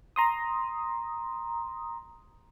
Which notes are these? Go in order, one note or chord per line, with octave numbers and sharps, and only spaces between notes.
A#5 C6 D#6